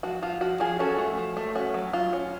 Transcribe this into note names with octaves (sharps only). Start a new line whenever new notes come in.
F3 F#4
F3 F4
F3 F#4
F3 F4 G#4
C#4 F#4 A4
A3
F3
A3
C#4 F#4
F#3
F#3 F4
C#4